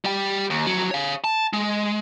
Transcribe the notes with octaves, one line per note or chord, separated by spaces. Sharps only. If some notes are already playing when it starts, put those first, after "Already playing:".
G3 G5
D#2
F2 F#3
C#5 F5
A5
G#3